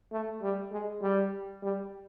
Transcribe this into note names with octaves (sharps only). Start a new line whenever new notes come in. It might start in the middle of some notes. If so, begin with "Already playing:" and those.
A3
G3
G#3
G3
G3